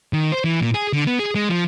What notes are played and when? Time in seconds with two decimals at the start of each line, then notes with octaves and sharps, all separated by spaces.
0.13 D#3
0.32 C5
0.44 E3
0.61 A#2
0.74 G#4
0.93 D3
1.07 B3
1.19 G#4
1.35 G#3
1.49 F3